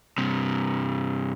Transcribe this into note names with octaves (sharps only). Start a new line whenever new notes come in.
G2 C3